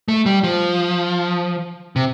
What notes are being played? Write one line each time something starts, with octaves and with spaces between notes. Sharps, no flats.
A3
G3
F3
C3